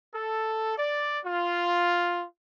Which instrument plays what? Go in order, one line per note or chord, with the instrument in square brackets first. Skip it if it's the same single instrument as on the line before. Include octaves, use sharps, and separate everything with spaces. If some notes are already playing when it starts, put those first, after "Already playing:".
[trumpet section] A4
D5
F4